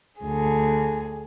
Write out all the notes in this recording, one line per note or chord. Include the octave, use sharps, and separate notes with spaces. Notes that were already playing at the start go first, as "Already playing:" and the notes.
D2 G#4